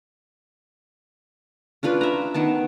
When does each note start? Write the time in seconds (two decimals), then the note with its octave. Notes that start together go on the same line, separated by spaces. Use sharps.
1.83 C#4 D4 F4 B4
2.01 E5 A#5
2.34 D#3 B3 A5